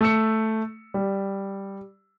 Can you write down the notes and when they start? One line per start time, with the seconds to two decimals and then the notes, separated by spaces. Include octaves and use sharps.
0.01 A3 E6 C#7
0.94 G3